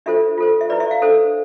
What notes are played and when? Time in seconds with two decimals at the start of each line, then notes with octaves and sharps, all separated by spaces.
0.06 D4 F4 A4 C5 E5
0.38 F4 A4 C5
0.61 E5
0.70 E4 B4 D5
0.80 E5
0.91 F5
1.02 D4 A4 C5